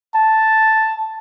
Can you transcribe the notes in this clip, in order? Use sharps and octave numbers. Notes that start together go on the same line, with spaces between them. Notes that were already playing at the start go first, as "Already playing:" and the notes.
A5